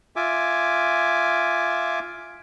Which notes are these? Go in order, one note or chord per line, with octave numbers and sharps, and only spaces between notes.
F4 E5 G#5 D6